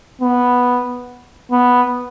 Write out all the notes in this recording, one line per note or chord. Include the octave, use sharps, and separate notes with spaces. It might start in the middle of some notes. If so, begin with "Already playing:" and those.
B3
B3